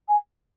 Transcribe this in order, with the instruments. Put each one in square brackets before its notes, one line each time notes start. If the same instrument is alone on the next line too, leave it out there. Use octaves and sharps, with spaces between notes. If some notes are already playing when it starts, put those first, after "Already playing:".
[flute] G#5